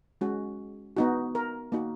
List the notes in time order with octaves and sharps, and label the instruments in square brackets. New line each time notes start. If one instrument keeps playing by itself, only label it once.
[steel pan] G#3 C#4 F#4
B3 D#4 F#4
A#4
A#3 D#4 F#4